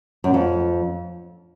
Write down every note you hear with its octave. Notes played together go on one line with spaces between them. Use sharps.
F#2
F2